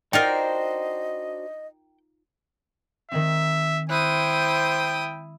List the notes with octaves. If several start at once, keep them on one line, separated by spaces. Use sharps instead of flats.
D4 D#4 F4 F#4 A#4 C5 D#5 G5
D#3 G#3 C4 E5
E4 C5 G5 D#6 F#6